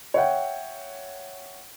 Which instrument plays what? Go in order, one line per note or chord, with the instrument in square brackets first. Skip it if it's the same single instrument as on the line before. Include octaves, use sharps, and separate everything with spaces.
[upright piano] C#5 E5 F#5 G5